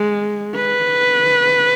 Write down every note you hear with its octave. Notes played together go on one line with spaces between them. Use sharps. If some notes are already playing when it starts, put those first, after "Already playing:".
Already playing: G#3
B4